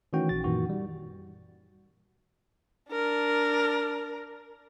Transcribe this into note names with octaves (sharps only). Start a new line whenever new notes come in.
D#3 E3 A3 C#4 F#4 G5
A#1 F#4 A6
F#2 A#2 D#3 E3 F#4
G3
D4 A#4